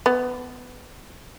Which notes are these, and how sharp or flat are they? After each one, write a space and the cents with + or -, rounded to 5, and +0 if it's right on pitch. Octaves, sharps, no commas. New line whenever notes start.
B3 +15